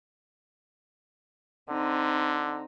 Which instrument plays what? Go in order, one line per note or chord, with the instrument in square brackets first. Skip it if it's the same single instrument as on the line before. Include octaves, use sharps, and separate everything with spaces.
[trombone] D3 [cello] C4 D#4